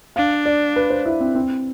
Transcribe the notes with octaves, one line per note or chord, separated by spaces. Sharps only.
D4 F5
D5
B4
C5
E4
C4
C4